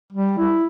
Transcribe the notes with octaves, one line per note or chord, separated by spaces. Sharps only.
G3
E4